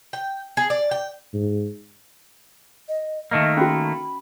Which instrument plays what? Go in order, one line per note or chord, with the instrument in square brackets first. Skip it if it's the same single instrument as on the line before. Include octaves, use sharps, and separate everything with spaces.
[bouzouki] G5
G#4
D5
G5
[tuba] G#2
[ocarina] D#5
[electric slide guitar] D#3 A3 A#3 [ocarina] D#5
[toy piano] C#4 F#4 [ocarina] B5